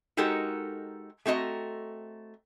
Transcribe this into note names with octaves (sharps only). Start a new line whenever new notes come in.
G#3 D#4 F#4 G4 A4 A#4
A3 C4 F#4 D#5 A#5